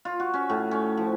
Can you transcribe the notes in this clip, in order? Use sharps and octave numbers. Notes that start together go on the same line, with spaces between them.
F4
F#4
C#4
A2
C#4
F3